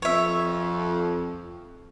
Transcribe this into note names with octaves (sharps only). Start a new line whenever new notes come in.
F2 C#5 E5